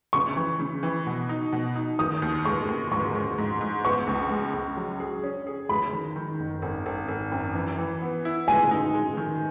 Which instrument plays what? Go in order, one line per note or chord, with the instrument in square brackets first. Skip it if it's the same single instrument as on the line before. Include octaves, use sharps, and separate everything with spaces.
[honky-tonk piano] C#3 [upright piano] C#6
[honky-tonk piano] E3
C#3
E3
B2
D#4
B2
D#4
[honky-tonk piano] D#3 [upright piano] D#6
[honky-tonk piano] D#2
[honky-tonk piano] G#3 [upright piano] C#6
[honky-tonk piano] D#2
[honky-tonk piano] G#2 [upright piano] C#6
[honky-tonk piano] G#3
G#2
G#2
[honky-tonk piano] B3 [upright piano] C#6
[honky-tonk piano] C#2
G#3
C#2
F#3
G#4
C#4
G#4
[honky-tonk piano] G#3 [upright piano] B5
[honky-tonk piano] D#3
D#3
F#1
G#1
G#1
G#1
F#2
E3
E3
B3
E4
[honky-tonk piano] G#3 [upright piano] G#5
[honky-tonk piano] D#4
G#3
D#3